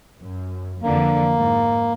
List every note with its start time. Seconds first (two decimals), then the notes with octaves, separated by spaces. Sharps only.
0.20 F#2
0.82 F2 D3 E3 A#3
1.36 G#2